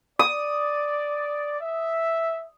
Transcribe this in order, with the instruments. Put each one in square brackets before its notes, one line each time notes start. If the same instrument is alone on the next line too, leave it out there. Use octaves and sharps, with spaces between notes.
[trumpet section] D5 [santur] D#6
[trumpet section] E5